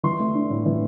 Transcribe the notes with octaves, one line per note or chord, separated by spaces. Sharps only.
E3 C6
A3
D4
A2
E3